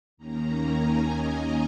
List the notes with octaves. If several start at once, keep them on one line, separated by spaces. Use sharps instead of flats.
D#2 D#3 A#3 C#4 A#5
G#5
D#5